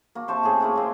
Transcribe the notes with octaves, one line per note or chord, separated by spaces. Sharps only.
A#3 F#4
C3 C5 A5 C#6
A2 C#3 G#4
A#3 E4 F#4
G#3 C4